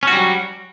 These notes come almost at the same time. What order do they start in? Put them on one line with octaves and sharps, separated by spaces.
C#4 F#4 G3 F#3